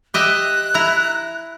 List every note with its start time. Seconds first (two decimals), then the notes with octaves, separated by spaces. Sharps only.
0.14 G4 D#5 E5 F#6
0.74 E4 A#5